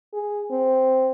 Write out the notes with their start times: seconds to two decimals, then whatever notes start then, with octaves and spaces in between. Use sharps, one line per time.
0.13 G#4
0.51 C4